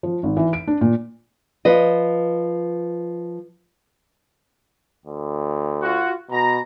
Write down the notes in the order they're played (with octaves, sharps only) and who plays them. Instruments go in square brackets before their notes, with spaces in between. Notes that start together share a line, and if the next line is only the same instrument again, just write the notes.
[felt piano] F3
G#1
E3
D7
D4
A#2
[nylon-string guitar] F3 B4 D#5
[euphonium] D2
[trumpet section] F4 F#4
[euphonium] B2 [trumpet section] A#5